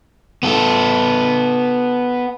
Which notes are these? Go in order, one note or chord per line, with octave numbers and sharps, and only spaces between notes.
B3 A4